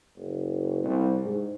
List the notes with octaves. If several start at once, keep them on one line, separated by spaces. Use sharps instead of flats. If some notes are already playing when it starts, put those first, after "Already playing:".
F#1
C2
G#2